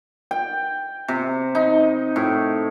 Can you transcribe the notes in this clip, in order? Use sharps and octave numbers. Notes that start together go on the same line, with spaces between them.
G5
C3
D#4
A2